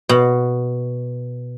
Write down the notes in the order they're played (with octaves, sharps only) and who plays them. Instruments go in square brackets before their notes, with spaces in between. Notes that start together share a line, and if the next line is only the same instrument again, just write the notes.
[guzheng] B2